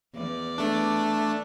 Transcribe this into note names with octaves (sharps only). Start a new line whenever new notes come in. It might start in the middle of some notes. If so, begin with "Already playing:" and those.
E2 D5
A3 D4